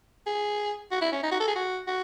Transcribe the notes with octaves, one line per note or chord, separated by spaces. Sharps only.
G#4
F#4
E4
C#4
D#4
F#4
A4
G#4
F#4
F#4